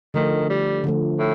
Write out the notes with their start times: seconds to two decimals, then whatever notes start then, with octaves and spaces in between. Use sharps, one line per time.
0.14 D3 D#3 F3 A3
0.49 G3
0.84 D3 F3 A3
1.19 A2